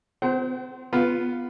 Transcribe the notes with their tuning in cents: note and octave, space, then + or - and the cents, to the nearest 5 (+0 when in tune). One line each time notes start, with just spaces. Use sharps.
C4 -40 C5 +0 F#5 +45
B3 +0 F4 -5